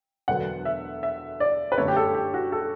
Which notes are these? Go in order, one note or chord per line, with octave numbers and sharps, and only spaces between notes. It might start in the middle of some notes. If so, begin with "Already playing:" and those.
E1 D2 D3 F#3 B3 F#5
E5
E5
D5
B4
G1 F#2 D3 A3 C#5
G4
A4
G4
F#4
A4